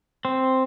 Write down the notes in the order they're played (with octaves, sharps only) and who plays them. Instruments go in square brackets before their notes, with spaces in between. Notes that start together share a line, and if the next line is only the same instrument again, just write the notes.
[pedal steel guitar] C4